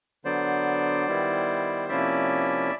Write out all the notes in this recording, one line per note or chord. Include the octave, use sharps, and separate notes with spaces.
D3 F#3 B3 C5 D5
D#3 G3 B3 E4
C3 F3 A#3 C#4 E4 D5 E5